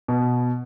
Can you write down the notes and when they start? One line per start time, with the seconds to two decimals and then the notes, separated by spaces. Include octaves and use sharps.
0.08 B2